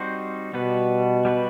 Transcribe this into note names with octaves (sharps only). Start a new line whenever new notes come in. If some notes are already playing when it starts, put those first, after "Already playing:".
Already playing: G3 C4 D#4 F#4 C5
B2 G3 B3 F#4 B4
G3 B3 F#4 B4